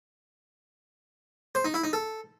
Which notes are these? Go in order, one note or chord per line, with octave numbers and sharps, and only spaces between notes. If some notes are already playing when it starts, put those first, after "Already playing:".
C5
D#4
E4
D#4
A4